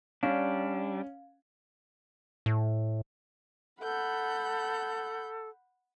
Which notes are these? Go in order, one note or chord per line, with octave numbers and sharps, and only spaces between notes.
G3 C#4 D4 F5
A2
A4 F#5 B5 G6